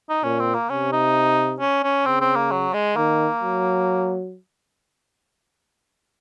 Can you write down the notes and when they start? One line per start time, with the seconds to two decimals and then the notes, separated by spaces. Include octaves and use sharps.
0.09 D#4
0.24 A#2 C#4
0.39 C4
0.54 A#3
0.69 C3 C#4
0.92 D#4
1.60 C#4
1.83 C#4
2.06 C#3 C4
2.21 C4
2.36 A#3
2.51 F#3
2.74 G#3
2.96 D#3 A#3
3.42 F#3